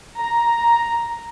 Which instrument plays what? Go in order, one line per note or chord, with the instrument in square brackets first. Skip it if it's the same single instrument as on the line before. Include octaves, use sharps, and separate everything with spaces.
[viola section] A#5